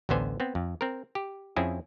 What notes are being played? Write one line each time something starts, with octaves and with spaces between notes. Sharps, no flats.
A1 D2 D3 B3 C5 G#5
B3 C4
F2
C4 A#4
G4
F2 C4 C#4 E4 G#4